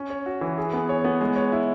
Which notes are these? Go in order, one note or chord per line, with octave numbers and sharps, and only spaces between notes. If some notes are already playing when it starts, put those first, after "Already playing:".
Already playing: C#4
C#5
F#4
E3
G#4
B3
C#5
B3
G#3
C#5
E4